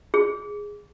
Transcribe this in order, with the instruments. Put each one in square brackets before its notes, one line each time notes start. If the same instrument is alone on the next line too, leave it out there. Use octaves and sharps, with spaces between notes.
[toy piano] G#4